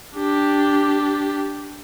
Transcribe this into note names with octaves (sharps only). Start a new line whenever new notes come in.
D4 G4